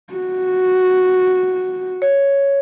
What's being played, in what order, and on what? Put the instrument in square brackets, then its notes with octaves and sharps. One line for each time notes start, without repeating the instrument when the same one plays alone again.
[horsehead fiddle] F#4
[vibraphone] C#5